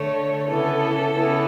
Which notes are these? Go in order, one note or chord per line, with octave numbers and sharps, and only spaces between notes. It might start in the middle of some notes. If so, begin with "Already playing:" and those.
Already playing: D3 A3 C#5
C#3 E3 B3 A4
C#3 E3 B3